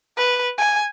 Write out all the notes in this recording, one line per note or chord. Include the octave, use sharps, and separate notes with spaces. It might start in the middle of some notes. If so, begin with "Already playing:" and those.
B4
G#5